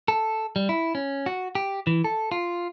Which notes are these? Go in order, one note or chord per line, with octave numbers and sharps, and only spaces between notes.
A4
G3
E4
C#4
F#4
G4
E3
A4
F4